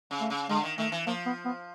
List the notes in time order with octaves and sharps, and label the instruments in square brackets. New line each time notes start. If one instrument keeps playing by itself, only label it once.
[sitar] C#3
[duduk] A3
[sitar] C#3
[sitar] D3 [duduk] G#3
[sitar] D#3
[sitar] D#3 [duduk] A3
[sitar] E3
[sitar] F3 [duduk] A#3
[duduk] B3
B3